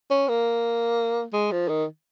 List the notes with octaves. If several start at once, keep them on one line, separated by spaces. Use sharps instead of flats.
C#4
A#3
G#3
F3
D#3